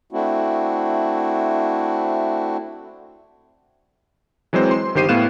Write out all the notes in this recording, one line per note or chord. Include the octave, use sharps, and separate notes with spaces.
A3 C4 D4 E4 F#4
E3 F#3 G#3 C4 C5
C6
G1 D#3 G4 C5 C7 D#7
A2 B3 F5 F#6 E7